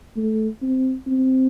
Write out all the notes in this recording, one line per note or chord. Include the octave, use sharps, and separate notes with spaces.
A3
C4
C4